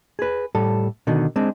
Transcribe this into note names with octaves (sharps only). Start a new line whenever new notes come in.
G#4 B4
A2 G3 A4
B2 D3 D#3
G#3 C4 D4